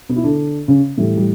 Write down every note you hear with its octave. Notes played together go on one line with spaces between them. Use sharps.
B2 B3
E4
D3 D4
C#3 C#4
A2 E3 G3
G3